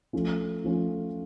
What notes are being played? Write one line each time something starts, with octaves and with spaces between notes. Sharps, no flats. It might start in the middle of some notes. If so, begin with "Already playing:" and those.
F3 A3 C#4 F4
F3 A3 C#4 F4